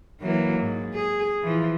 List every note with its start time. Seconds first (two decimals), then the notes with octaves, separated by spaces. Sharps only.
0.20 E3 F#3 A#3
0.60 G#2
0.93 G#4
1.43 E3 F3